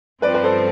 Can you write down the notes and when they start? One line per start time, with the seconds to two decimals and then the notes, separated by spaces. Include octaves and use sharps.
0.22 G2 F3 C4 B4 D5
0.34 B4
0.43 A4 C5